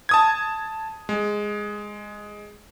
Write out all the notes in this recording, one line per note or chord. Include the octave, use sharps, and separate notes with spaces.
A5 D#6 G#6
G#3